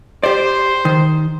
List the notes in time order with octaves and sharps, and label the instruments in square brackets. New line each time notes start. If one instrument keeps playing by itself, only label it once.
[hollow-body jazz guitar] G4 D5 [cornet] C5
[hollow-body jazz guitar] D#3